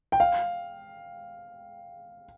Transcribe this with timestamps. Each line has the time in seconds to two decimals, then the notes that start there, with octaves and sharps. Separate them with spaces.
0.12 G5
0.20 F5